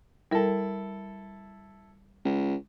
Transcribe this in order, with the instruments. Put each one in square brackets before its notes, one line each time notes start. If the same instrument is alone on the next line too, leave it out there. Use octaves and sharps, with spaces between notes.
[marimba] G3 A#4 [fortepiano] E4 A4
[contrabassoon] C#2